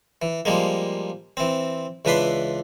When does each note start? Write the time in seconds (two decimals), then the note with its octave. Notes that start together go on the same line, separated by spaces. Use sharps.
0.22 E3
0.45 F3 G3 G#3 A#3
1.37 E3 C4
2.05 C#2 E3 D4 B4 B5 C6